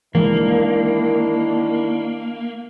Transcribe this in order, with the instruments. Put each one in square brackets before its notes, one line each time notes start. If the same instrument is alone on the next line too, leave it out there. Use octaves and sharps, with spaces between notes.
[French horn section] D#3 D4 E4 [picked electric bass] E3 G#3 [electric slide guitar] A#3